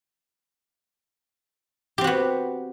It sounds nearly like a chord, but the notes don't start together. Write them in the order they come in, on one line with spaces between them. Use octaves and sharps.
G4 C4 F#4 B3